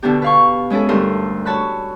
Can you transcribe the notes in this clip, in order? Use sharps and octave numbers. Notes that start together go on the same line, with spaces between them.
B2 D3 B3 D4 G4
B4 F5 C#6
G#3 C#4 E4 G#4 A4
D2 G2 A4 A#4 C6
F#4 C#5 A5 B5 F#6